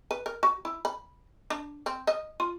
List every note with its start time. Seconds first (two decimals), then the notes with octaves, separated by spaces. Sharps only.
0.11 B4
0.26 A#4
0.43 F#4
0.65 E4
0.85 B5
1.50 D4
1.86 C4
2.07 D#5
2.40 F4